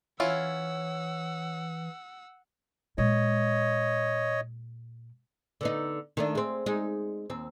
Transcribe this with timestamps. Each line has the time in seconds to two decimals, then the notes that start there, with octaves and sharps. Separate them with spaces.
0.20 E3 C#4 E4 F4 C#5 F#5 E6
2.98 A#2 G#3 C#5 D#5
5.61 D3 B3 D#4
6.17 D#3 A3 D4
6.35 G#3 C4
6.66 G#3 D#4
7.30 D#2 C4